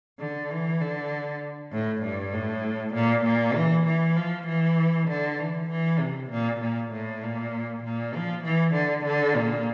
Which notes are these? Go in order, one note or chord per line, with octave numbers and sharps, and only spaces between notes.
D3
E3
D3
A2
G2
A2
A#2
A#2
E3
E3
F3
E3
D3
E3
E3
C3
A#2
A#2
A2
A#2
A#2
F3
E3
D3
D3
A#2